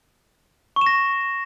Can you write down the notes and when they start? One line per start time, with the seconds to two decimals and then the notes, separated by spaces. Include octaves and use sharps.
0.76 C#6
0.81 E7
0.86 A#6